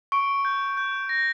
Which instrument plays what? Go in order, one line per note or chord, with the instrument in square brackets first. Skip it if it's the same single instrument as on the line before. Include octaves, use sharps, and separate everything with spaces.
[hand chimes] C#6 [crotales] D7
[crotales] G6
G6
A#6